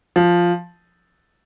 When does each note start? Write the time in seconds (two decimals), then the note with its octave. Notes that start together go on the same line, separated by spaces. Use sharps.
0.16 F3